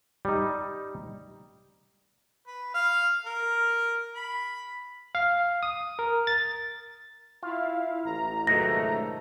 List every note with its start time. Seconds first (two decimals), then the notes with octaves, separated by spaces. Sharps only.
0.25 G3 D#4
2.47 B4
2.74 F5
3.26 A#4
4.15 B5
5.15 F5
5.63 D#6
5.99 A#4
6.27 A6
7.43 E4 F4 F5
8.05 A1 A#5
8.47 C#2 G#2 B2 D#3 F#3 A3 A#6